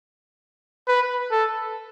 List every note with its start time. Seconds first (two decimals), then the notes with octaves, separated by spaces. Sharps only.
0.88 B4
1.31 A4